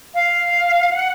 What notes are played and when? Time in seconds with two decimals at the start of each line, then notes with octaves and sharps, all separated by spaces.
0.15 F5
0.91 F#5